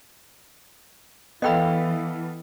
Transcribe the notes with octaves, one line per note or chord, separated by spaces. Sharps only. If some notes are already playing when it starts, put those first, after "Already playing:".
E3 B3 A4 D#5 F5 G5 B5